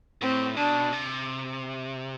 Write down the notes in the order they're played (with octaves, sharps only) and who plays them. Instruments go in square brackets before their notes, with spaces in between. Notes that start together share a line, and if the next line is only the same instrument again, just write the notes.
[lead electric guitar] A2 [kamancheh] C4
[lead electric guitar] B2 [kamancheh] D4
[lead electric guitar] C3